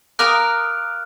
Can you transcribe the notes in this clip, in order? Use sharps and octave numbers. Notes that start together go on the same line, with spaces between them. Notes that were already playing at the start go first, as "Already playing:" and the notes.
A#4 F5 D6 D#6 F6 F#6 D7